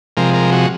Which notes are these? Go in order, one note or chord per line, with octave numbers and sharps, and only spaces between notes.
C3 F3 G#3 A#4
A#4
F#4